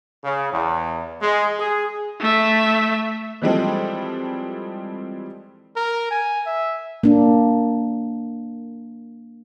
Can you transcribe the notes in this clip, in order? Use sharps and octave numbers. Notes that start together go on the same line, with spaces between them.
C#3
E2
G#3
G#4
A3 E5
E3 F3 G3 G#3 C4 A4
A#4
G#5
E5
A#3 D4